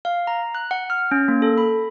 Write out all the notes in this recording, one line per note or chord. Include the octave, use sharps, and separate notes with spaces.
F5
A#5
F#6
F#5
F6
C#4
A#3
A4
B5